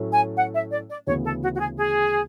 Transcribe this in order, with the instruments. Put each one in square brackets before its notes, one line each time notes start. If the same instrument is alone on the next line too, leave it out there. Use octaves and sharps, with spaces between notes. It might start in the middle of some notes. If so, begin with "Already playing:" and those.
Already playing: [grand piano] A2 F#3 A3 C#4
[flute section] G#5
F#5
E5
D5
D5
[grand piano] D2 C#3 E3 B3 [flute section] C#5
[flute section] A4
F#4
F#4
G#4
G#4